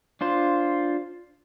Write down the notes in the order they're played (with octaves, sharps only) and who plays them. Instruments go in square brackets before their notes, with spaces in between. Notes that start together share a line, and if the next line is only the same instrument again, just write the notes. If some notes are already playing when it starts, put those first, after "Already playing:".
[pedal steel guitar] D4 F4 C5